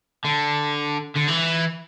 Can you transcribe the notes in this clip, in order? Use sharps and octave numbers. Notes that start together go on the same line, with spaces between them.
D3
D3
E3